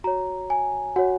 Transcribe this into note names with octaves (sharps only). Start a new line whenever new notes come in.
F#4 C#5 A#5
G#5
F#4 C#5 F#5